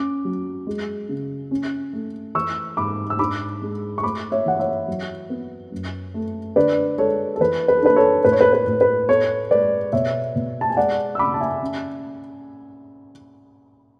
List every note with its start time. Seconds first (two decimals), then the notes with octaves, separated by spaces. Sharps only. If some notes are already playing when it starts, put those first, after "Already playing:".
Already playing: C#4 D6
0.25 F#3
0.67 G#3
1.09 C#3
1.51 C#4
1.93 A3
2.35 E3 C#6 E6
2.77 G#2 B5 D6
3.10 E6
3.19 D4 B5 D6
3.62 G#3
3.98 C#6
4.03 A3 B5 D6
4.32 C#5 E5
4.46 E3 F#5
4.60 C#5 E5
4.88 F#3
5.30 B3
5.72 F#2
6.14 A3
6.56 D3 B4 D5
6.98 G#3 A4 C#5
7.36 A4
7.40 E3 B4
7.68 B4
7.77 A4
7.83 D4 B4
7.96 A4 C#5
8.25 A2 B4
8.32 C#5
8.41 B4
8.53 B4
8.66 A2
8.81 B4
9.09 B3 A4 C#5
9.51 G#3 B4 D5
9.93 B2 C#5 E5
10.35 B2
10.61 A5
10.70 G#5
10.77 G#3 D5 F#5
11.15 E6
11.19 C#3 B5 D6
11.34 A5
11.41 E5 G#5
11.62 C#4